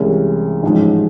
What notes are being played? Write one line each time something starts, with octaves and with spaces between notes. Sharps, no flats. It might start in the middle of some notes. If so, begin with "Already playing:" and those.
Already playing: C2 C3 E3 G#3 C#4
A1 G#2 F3 G#3 C#4